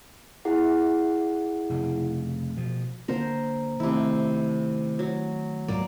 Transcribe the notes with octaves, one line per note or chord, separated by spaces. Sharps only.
E4 G#4 F#5
F1 C#3
B2 F3
D3 A#3 A#4 C5
C3 D#3 A3 E4
F#3
D2 G#2 F#3 A#3 D5